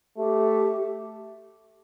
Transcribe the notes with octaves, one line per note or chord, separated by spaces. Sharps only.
A3 G4